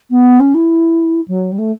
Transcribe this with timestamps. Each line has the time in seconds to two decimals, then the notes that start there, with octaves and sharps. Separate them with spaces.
0.10 B3
0.39 C#4
0.54 E4
1.27 F#3
1.51 G3
1.58 A3